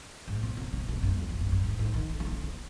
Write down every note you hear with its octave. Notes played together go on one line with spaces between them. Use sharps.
G#2
C3
C3
C3
B2
G2
F2
F2
G2
G2
G#2
G#2
D#3
D3
D#3
D3
C3